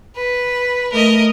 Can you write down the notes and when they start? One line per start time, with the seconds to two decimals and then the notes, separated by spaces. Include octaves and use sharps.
0.16 B4
0.92 A3 A#4 D#5